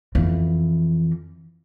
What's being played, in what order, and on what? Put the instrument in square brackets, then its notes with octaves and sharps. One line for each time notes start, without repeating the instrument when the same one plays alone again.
[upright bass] F2 E3